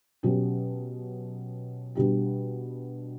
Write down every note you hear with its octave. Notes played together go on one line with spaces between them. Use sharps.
B2 F#3 C#4 G4
B2 G3 D4 G4